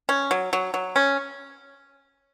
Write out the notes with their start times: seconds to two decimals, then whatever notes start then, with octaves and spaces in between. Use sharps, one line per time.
0.09 C#4
0.31 F#3
0.53 F#3
0.74 F#3
0.96 C#4